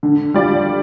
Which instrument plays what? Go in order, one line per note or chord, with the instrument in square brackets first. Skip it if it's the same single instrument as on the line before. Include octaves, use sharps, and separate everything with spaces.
[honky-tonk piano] D3
G3 F4 D5